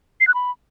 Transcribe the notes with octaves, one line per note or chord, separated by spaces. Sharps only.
C7
F#6
B5